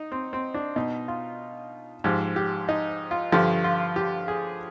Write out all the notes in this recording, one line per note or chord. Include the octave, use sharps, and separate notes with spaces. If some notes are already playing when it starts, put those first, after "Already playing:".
Already playing: D#4
C4
C4
D4
B2 D#4
F4
G#2 F3 G4
G4
D#4
F4
G2 D3 F3 G4
F4
G4
G#4